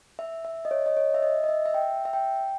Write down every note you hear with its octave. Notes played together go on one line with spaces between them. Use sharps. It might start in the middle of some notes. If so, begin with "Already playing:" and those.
E5
E5
D#5
C#5
D#5
C#5
E5
D#5
D#5
E5
E5
G5
E5
G5